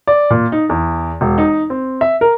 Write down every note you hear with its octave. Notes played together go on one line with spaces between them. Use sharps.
D5
A#2
D#4
E2
E1
D#4
C4
E5
A#4